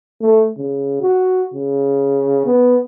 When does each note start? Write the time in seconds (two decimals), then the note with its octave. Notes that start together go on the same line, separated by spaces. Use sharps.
0.21 A3
0.57 C#3
1.01 F#4
1.54 C#3
2.46 B3